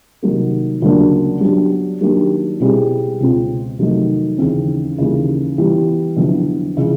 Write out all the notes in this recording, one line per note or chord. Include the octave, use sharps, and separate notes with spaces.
C3 D#3 F#3 A#3
D2 C#3 F#3 A#3 D4
F#3 B3 D4 G4
D#3 F#3 A#3 D4 G4
B2 G3 C4 E4 G#4
C#2 B2 G#3 C4 F4
F2 C3 D#3 F#3 A3
D#2 C#3 E3 G#3 C4
D#2 C#3 E3 G3 A#3
E3 G3 B3
F2 D3 F#3 B3 E4
C#3 E3 G#3